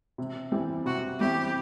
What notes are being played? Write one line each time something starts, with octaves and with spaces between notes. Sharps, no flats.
C3
E3 G3 C4 E4
C3 F#4
E3 G3 C4 E4 G4